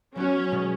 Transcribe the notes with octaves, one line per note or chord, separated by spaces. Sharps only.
F#3 B3 C#4 F#4
B2 G#3